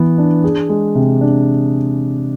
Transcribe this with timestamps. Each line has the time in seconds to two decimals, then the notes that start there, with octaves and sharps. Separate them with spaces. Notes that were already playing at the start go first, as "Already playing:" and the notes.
Already playing: E3 B3
0.18 D4
0.44 G#4
0.69 G#3
0.95 C3
1.21 D4